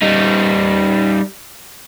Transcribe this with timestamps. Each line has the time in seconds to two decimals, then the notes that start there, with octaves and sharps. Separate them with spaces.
0.02 G3 D#4